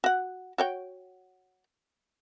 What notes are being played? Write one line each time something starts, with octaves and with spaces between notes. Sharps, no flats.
F#4 F#5
F#4 C#5 G5